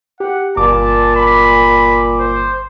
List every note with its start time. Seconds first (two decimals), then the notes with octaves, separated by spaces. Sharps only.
0.20 G4 F#5
0.57 G1 A#2 A5 D6
1.16 B5
2.20 C5